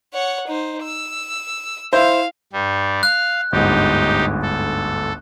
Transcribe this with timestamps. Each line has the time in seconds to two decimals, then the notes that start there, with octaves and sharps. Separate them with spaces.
0.14 C#5 F#5
0.47 D#4 C5
0.82 E6
1.93 E4 C5 F5
2.53 G2 G3
3.03 F5 F#6
3.52 G1 D2 G#2 D#4 G4
4.42 A4